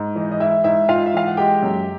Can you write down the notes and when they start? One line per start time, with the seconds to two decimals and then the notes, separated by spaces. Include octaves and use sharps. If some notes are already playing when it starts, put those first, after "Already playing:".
Already playing: G#2
0.15 E3 D#4 D#5
0.32 D#5
0.40 G#3 E4 E5
0.64 G#2 E4 E5
0.88 G#2 F4 F5
1.06 E5
1.13 E3 F5
1.28 F#5
1.37 G#3 G4 G5
1.63 F#2